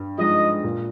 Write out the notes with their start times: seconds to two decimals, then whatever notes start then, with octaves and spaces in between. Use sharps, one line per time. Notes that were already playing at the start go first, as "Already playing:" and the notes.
Already playing: G2
0.18 F3 G#3 D#4 D#5
0.64 A#2